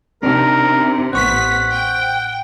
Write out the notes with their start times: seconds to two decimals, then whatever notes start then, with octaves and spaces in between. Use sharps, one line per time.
0.23 C3 C4 D4 D#4 A#4
1.13 A1 B3 C5 F#5 C#6 B6
1.73 G5